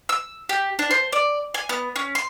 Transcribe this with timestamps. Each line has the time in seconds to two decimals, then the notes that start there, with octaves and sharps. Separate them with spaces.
0.09 E6
0.49 G4
0.79 D4
0.91 C5
1.12 D5
1.54 G#5
1.69 B3
1.96 C#4
2.15 C6